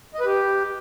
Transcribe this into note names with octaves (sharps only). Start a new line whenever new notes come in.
D#5
B4
G4